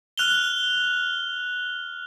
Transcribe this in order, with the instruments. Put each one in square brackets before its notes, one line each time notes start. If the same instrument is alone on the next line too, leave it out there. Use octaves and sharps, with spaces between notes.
[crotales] F6 F#6 F7 G7